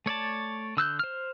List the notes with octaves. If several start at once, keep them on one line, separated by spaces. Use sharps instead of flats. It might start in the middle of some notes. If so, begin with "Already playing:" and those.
A3 C#5 D5 A5
D3 E6 F#6 G6
C5 F6